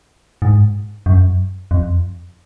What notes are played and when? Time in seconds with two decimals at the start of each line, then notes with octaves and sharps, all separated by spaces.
0.42 G#2
1.06 F#2
1.71 F2